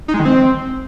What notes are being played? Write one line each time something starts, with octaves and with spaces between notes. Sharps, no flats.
D#4
G#3
D#3
C4